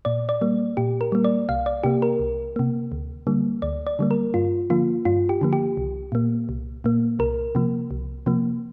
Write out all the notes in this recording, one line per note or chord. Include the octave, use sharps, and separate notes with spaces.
A#2 D5
D5
G3 A#3
A#2 G4
A#4
G3 A#3
D5
C2 F5
D5
C3 A#3 G4
A#4
C2
C3 A#3
D2
D3 G3 A#3
D2 D5
D5
D3 G3 A#3
A#4
G2 F4
D3 F3 A#3 F4
G2 F4
G4
D3 F3 A#3
G4
C2
A#2 A#3
C2
A#2 A#3
C2 A#4
C3 F3 A#3
C2
C3 F3 A#3